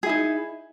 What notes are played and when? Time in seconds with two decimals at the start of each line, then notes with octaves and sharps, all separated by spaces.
0.03 G#4
0.06 E4
0.09 D#4